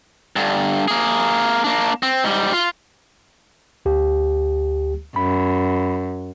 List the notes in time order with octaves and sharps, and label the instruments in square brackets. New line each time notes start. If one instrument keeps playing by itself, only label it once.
[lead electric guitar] G2 D3
A#3 G#4
A#3 D4
C4
G#2 G3
F4
[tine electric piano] D2 G4
[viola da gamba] F#2 [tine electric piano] B5